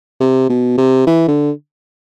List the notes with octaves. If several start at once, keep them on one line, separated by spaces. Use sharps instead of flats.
C3
B2
C3
E3
D3